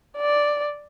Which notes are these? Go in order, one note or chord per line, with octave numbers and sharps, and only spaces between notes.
D5